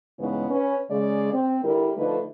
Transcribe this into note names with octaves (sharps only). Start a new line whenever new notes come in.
G2 C#3 E3 G#3 B3 D#4
C#4 B4
C#3 G#3 D5
C4
D3 G3 E4 A#4
D3 F3 A3 D#4 B4